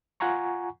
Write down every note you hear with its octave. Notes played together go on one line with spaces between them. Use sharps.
F4 F#5 G#5 A#5 C#6